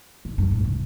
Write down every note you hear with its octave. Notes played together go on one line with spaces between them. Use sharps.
D3
G2
A2
C3